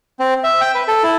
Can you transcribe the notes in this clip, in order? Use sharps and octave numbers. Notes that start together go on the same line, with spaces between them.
C4
E5
G5
B4
A4
E4